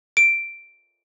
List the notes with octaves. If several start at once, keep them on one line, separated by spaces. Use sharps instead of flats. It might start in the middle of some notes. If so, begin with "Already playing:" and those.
D7